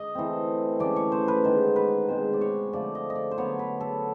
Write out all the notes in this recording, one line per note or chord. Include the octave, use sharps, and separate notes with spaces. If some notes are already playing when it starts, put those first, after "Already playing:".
Already playing: D#5
E3 A3 C4
E3 A3 C#4 D5
C#5
C5
B4
D#3 G#3 B3 D#4 C5
B4
B2 G#3 C4 C5
D5
C#5
D3 F3 A3 D5
D#5
D#5
D5
C5
D3 F#3 B3 C#5
B4
A4